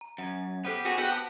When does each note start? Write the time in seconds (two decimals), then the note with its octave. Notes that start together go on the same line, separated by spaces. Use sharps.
0.01 A#5
0.18 F#2 F#5 A#5 G#6
0.65 B3 G4 A4 C5 F#5
0.85 F#4 G#4
0.98 F#4 F#5 G5 E6 B6
1.12 A5 D#6